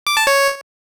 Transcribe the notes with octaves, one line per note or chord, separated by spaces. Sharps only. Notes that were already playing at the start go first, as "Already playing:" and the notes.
D6
A5
C#5